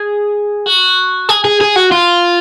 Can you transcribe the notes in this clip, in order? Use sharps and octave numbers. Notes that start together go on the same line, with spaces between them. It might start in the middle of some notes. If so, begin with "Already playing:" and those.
Already playing: G#4
F#4
G#4
G#4
G#4
F#4
F4